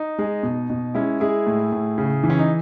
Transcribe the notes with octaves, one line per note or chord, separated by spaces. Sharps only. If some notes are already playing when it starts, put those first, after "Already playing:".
Already playing: D#4
G#3
B2
B2
G#3 C#4 E4
G#3 E4 G#4
A2
A2
C#3
E3
C#4
D#4